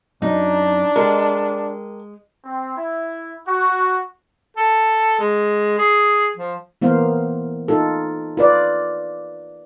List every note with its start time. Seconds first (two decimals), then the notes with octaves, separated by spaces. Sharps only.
0.22 F#2 D4 D#4
0.96 G#3 G4 A4 A#4
2.45 C4
2.76 E4
3.47 F#4
4.56 A4
5.19 G#3
5.79 G#4
6.37 F3
6.82 E3 A#3 B3 C5 F5
7.68 D#4 F4 A4
8.37 F4 B4 D5